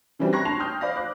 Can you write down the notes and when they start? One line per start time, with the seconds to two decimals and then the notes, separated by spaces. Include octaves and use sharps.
0.19 C#3 E3 F#3 G3 C4 D4
0.33 A#5 B5 C#6 F#6 G#6 A#6
0.45 D4 A5 C6 C7 F7
0.59 G5 D#6 F6 G6
0.81 C5 D5 F5 B5 A#6
0.95 D6 F#6